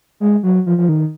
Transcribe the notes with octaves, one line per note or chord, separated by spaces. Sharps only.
G#3
F#3
F3
F3
D#3